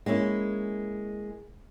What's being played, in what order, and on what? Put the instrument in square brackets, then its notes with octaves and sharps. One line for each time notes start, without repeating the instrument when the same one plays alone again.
[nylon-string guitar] G#3 A#3 C#4 E4